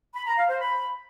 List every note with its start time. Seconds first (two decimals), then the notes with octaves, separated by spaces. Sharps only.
0.16 B5
0.27 A#5
0.38 F5
0.50 C5
0.61 B5